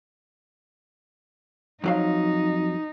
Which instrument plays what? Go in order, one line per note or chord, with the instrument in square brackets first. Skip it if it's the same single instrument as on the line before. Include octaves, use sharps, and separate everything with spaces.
[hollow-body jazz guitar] F2 F#3 F5 [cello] D#4